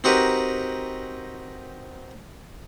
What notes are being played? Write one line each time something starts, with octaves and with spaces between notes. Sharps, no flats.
C4 D#4 F#4 G4 A#4 B4